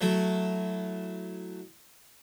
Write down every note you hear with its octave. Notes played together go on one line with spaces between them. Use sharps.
F#3 A3 E4